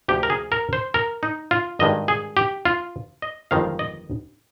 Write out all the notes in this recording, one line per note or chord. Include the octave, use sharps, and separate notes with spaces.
D2 C3 F3 G4
A#4
G#4
A#4
C5
A#4
D#4
F4
G#1 G2 D#3 G#3 D#5
G#4
G4
F4
D#5
G1 F2 D#3 G#3 C4 F5
D#5